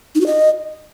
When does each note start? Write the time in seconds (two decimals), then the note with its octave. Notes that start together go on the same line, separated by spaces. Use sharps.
0.15 D#4
0.21 F#4
0.26 D#5